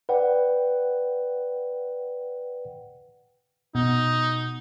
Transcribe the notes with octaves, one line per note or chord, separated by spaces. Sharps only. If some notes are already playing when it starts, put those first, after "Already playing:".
B4 D5 F#5 G5
B2 D#4